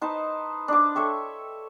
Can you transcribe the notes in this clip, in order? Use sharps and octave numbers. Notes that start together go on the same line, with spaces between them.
D#4 B4 C5 A5
D4 C5 D6
A4 C#5 E5 G5